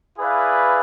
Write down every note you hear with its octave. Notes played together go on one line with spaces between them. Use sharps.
E4 G#4 B4 D5 F5